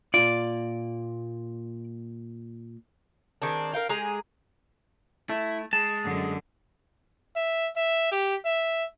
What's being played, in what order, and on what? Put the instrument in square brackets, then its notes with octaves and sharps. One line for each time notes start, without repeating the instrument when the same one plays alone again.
[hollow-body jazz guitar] A#2 F4 [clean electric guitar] D5
[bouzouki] D#3 G#3 C4 D4
A#4 F5 G5
G#3 G4 G#4 A#5
[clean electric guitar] A3 [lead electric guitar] E4
[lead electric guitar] G#3 [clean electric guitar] A5
[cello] F#2 D3
[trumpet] E5
E5
G4
E5